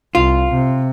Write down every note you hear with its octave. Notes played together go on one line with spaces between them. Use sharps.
C2 F4
C3